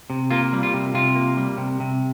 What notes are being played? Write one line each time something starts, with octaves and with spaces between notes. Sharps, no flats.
C3
A#3 F4
G3
F4
C3
C3 F4
A#3
G3
C3
C3